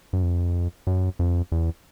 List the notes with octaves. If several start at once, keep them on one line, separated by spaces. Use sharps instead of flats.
F#2
F2
F#2
F2
E2